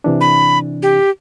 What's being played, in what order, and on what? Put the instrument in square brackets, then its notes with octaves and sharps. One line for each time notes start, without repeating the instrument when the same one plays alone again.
[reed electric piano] C3 E3 D4
[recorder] B5
G4